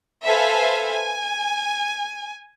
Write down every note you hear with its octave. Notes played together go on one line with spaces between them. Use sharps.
A4 B4 C5 E5 F5 G#5
G#5